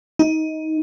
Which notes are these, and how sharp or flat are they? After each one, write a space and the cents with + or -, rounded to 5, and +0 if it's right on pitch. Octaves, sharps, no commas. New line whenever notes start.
D#4 +20